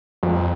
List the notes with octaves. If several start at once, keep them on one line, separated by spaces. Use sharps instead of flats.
F2